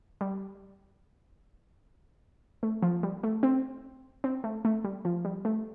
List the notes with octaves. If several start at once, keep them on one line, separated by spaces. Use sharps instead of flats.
G3
A3
F3
G3
A3
C4
C4
A3
A3
G3
F3
G3
A3